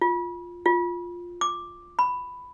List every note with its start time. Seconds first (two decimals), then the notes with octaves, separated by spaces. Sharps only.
0.01 F4
0.66 F4
1.41 D6
1.99 B5